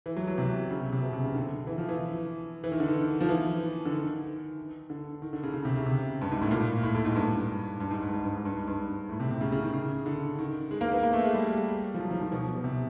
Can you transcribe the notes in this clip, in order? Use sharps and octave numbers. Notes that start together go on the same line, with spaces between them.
E3
F#3
F#3
C3
C#3
C3
C3
B2
C3
C#3
D3
E3
F3
E3
E3
D#3
D3
D#3
F3
E3
D3
D#3
D3
D#3
D3
C#3
C#3
C3
C#3
C3
G2
G#2
A2
A#2
A2
A2
G#2
G2
G2
G#2
G2
G#2
G2
G#2
G2
G#2
G2
A2
C3
C3
C#3
C#3
D#3
C#3
D3
D#3
G#3
A#3
B3
A#3
A3
G#3
G3
F3
F#3
F3
D#3
B2
B2
C3